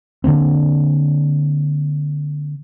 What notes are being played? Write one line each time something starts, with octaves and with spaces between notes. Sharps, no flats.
D3 D#3 A#3 C4